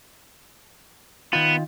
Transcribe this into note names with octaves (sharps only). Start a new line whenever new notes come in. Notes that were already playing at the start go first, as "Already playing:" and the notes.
D#3 B3 F4